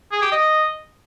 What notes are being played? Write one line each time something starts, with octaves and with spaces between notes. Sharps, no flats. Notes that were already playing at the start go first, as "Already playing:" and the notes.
G#4
G4
D#5